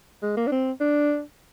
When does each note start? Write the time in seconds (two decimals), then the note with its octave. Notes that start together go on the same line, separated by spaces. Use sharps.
0.23 G#3
0.37 A#3
0.47 D4
0.52 C4
0.81 D4